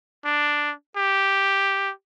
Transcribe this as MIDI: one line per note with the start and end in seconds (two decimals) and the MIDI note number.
0.25 0.73 62
0.97 1.91 67